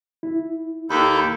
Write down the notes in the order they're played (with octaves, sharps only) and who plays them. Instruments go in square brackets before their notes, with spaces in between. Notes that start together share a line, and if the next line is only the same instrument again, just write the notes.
[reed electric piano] E4
[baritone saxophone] D#2 [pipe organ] A#3 A4 G6 [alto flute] B5